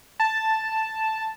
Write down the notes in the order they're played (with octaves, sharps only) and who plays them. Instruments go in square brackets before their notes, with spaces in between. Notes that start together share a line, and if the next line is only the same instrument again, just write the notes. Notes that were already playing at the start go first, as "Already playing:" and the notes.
[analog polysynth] A5